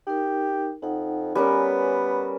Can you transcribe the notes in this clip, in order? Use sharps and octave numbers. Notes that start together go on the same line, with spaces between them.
D#4 G4 A#4
F2 D#4 F#5
G3 B3 C#4 A#4 B4 C#5 G#5